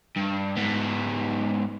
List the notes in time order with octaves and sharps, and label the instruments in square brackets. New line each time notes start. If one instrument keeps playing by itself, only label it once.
[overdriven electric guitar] G2
G#2 B3